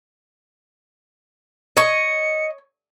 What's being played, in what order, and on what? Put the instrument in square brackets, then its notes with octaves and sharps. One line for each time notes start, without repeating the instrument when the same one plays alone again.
[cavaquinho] C#5 C#6 [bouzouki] D#5 [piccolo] C#7